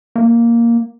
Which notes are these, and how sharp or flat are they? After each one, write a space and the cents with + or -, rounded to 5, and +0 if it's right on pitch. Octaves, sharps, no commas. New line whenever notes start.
A#3 +0